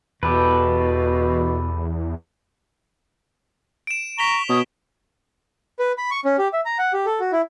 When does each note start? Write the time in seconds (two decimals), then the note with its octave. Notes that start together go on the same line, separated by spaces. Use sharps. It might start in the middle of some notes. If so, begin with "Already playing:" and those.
0.23 E2 B2 G4 A4 B4
3.87 D7 E7
4.19 A#5 C#6 B6 F7 G7
4.49 B2 C#5 D#6
5.79 B4
5.98 B5
6.11 C#6
6.25 C#4
6.38 G4
6.53 E5
6.65 A#5
6.79 F#5
6.93 G4
7.06 A4
7.20 F#4
7.32 E4